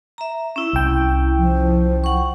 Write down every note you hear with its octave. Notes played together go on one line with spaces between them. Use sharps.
E5 A#5
C#4 E4
C2 G5
F3
F#5 C#6